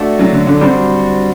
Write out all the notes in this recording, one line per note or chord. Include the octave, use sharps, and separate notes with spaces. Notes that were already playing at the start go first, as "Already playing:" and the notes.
Already playing: A3 D4 F#4 A4
F#3
D3
D3
G3 C4 D4 F#4 C5